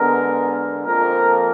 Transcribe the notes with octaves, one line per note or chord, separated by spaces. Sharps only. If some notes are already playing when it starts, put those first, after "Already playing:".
Already playing: D3 G#3 B3 A#4
F2 F3 A#3 A#4